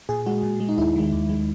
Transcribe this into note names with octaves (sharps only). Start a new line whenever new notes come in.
A#2 G#4
G#3 F#4
A#2
G#3
D#4
D#2 E4
D#3 G#3
D#2
D#3 G#3